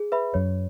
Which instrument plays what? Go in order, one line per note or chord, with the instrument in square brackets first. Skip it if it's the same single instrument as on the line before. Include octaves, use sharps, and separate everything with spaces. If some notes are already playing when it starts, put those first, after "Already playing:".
Already playing: [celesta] G#4
B4 E5 B5
[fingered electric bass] F#2 [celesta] C#5